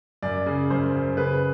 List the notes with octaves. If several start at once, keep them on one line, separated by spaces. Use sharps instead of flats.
F#2 D5
C#3
F#2 C5
F#2
C#3 B4